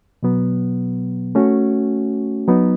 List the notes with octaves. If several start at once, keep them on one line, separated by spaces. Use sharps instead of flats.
B2 F#3 B3
A3 C#4 F#4
F#3 B3 D#4